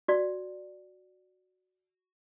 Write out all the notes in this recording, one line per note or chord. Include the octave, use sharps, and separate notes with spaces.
F#4 D5